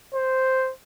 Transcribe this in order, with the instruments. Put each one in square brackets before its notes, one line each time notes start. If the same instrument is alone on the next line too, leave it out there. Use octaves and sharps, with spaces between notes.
[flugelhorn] C5